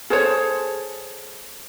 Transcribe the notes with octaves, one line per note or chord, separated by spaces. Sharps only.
G#4 A4 C5 C#5